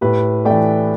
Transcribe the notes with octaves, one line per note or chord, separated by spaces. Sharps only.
A2 G4 B4
E3 A3 D5 G5